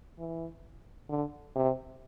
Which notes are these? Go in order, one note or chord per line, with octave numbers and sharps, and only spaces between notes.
E3
D3
C3